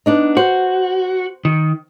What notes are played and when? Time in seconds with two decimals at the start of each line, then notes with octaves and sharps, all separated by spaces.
0.06 B3 D4 D#4
0.37 F#4 C5
1.45 D#3